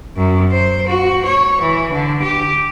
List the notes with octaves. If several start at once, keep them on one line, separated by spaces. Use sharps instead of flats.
F#2
C5
F#4
C#5
E3
D3
G4